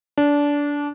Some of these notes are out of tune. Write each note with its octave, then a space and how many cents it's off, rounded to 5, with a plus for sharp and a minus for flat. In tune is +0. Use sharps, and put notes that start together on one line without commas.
D4 -20